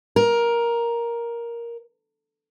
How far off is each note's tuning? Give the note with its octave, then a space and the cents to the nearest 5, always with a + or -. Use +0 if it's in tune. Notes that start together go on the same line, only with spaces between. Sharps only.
A#4 +10